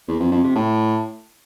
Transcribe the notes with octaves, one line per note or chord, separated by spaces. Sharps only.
E2
F2
F2
C3
A2